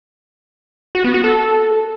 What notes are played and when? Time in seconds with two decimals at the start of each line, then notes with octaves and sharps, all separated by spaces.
0.95 F#4
1.04 B3
1.14 F#4
1.24 A4